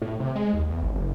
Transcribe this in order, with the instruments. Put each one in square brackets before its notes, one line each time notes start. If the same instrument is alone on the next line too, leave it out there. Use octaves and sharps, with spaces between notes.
[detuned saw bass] A2
C3
G#3
D#2
E2
G#1
F#1